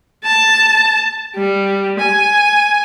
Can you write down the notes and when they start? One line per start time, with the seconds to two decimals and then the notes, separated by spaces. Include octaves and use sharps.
0.24 A5
1.36 G3
2.00 G#5